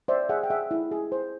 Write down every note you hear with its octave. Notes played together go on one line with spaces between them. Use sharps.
C5 D5 E5
G#4 E5 F#5
G5
G#4 E5 F#5
E4
G#4
C5